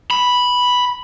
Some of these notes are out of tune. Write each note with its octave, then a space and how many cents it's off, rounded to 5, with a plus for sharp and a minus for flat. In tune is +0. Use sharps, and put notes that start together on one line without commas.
B5 -5